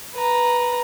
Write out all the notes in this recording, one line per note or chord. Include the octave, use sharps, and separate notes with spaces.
B4 A#5